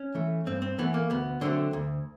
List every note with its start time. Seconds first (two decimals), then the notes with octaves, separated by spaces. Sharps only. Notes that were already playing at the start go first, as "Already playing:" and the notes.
Already playing: C#4
0.15 E3 A3
0.46 G2 C4
0.62 C4
0.79 E3 A3 B3
0.94 A#3
1.10 D2 B3
1.41 D3 F#3 A3 C4
1.73 D2